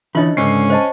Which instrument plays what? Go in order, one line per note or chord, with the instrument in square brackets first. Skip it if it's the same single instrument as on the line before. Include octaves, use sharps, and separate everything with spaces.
[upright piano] D3 C#4 D#4 [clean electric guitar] E3 B5 [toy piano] F4 D#5
[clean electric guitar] C#2 G#2 D3 [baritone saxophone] C#4 [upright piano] C7
[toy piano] C5 D#5 A5